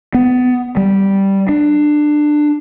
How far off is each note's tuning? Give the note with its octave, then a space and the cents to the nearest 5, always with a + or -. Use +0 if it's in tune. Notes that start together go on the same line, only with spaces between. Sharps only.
B3 +20
G3 -5
D4 +20